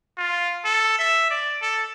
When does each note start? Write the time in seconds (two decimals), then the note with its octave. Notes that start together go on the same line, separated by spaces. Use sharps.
0.17 F4
0.65 A4
0.99 E5
1.31 D5
1.61 A4